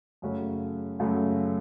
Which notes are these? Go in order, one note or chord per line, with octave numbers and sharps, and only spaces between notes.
F#2 C#3 F#3 A3 C#4
F#2 C#3 F#3 A3 C#4